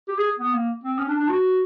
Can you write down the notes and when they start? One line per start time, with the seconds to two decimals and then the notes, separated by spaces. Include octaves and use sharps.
0.08 G4
0.18 G#4
0.39 B3
0.54 A#3
0.84 C4
0.98 C#4
1.08 D4
1.18 D4
1.29 F#4